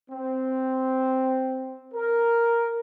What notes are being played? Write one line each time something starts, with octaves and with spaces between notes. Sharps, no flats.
C4
A#4